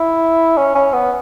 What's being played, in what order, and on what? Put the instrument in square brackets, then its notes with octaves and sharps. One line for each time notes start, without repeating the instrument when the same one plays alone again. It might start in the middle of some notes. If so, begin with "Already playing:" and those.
Already playing: [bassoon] E4
C#4
C#4
B3